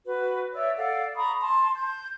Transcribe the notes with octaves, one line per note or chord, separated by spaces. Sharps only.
F#4 B4
C#5 D5 E5 E6
A4 D5 F5 F#5
A#5 B5 C#6 D#6
A5 C6
G6